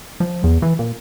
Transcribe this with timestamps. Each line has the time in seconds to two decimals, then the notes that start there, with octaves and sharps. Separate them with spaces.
0.20 F3
0.44 E2
0.62 E3
0.79 A#2